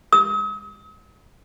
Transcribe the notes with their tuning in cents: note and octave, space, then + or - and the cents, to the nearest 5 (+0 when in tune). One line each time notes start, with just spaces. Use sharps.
D#6 +45